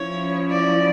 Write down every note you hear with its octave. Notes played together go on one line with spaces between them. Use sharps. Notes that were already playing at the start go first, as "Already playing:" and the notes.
Already playing: F3 C#4 E4 C#5
D5